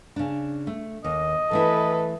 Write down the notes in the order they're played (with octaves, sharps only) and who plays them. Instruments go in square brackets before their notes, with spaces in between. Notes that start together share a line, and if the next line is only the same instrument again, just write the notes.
[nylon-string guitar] C#3 D4
A3
[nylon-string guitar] D#2 [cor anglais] D#5
[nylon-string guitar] E3 A3 E4 [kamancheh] A4 B4